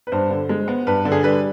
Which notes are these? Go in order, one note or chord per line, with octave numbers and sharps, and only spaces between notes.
B4
G2 C5
D3
G#3
B3
G2 B4
D3
G#4
G3 B4